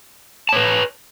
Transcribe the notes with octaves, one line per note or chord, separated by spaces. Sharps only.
B4 C#5 A5